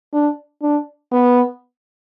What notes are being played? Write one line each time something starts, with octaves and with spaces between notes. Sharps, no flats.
D4
D4
B3